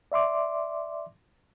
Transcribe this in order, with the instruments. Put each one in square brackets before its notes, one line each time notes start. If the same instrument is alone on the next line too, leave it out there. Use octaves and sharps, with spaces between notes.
[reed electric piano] D5 E5 C6 D6